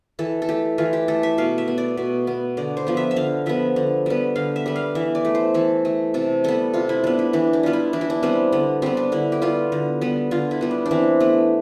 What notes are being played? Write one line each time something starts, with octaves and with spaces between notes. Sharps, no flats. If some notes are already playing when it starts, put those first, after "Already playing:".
E3 A4
A4
A3 G4
E3 F4
G4
A3 A4
E5
B2 F5
E5
B3
D5
B2
B3
D3 D5
C5
F3 B3
E5
E5
D3 F5
F3 B3 E5
D3
G3 B3
D3 F5
E5
G3 B3
F5
E3 E5
D5
A3
C5
E3 A4
A3
C3 A4
G3 B3 A4
C3 F4
E4
G3 B3 D4
E4
E3 D4
D4
G3 B3 F4
E4
E3 D4
E4
D4
G3 B3 C4
D3 B3
G3 B3 C4
D4
D3 E4
G4
G3 B3 F4
D3
G3 B3
D3 F4
E4
G3 B3
D4
D4
E3 C4
A3 B3